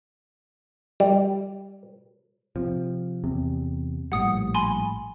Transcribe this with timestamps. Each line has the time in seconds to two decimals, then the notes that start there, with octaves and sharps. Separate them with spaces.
1.00 G3
2.56 C3 F3
3.24 E2 C3
4.12 A#1 A2 G3 F#5 D#6 C#7
4.54 G#5 B5 C6